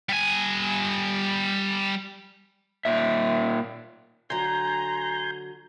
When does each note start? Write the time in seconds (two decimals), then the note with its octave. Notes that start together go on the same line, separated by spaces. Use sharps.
0.09 G3 G#5
2.85 A#2 E5
4.30 D3 F#3 G#5 A#5 C6 G6